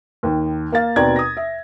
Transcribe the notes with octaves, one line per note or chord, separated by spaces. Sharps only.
D#2 D#3
A#3 F5 A6
D#2 B2 C4 D5 A#5 G#6
D#6 A#6
E5